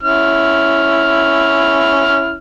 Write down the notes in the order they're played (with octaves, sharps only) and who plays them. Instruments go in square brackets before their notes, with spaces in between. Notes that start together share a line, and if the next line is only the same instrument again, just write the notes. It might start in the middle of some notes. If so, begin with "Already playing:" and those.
[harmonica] C#4 E4 F6